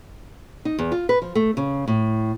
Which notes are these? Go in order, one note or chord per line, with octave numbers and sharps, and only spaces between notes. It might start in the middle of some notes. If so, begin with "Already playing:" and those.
D#4
E2
F4
B4
F3
A3
C#3
A2